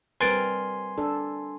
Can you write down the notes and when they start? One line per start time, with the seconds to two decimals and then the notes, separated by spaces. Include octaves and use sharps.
0.20 G3 C4 A#4 B4 G#5 C6 A6 D7
0.98 D4 A4